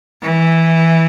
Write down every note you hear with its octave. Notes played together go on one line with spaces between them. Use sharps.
E3